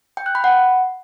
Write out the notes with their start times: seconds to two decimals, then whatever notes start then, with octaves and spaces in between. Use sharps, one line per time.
0.17 G5
0.26 F#6
0.35 B5
0.44 F#5